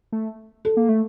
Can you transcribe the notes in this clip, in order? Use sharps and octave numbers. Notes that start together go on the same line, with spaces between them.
A3
A4
A#3
A3